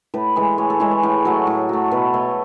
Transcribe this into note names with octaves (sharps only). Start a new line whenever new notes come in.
A2 B4
E3 G#3
A2 C#5
A4
E3 G#3 C#5
C#5
A2
F#3 A3
A2
F#3 A3
B2 B4
A3 C#5